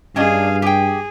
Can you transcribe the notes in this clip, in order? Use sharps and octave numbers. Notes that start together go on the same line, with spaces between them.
G2 C#4 D4 G#4 D#5 F5
G4 G#4 G5